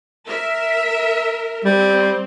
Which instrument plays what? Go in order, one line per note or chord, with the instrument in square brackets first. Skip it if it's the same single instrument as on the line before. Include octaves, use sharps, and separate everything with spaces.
[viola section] A#4 E5
[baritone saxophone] G3 [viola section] C4